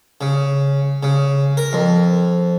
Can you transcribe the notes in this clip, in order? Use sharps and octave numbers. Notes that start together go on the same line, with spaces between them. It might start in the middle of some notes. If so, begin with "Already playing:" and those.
C#3
C#3
A#4
F2